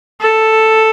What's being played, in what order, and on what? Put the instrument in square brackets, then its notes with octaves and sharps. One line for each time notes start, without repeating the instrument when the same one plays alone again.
[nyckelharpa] A4